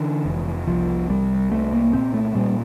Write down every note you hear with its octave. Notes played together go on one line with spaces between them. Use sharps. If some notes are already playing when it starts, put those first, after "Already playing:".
Already playing: D3 E3
F1
C2 F3
C2 G3
C2 A3
A#3
A#2 C4
A3
A#2 G3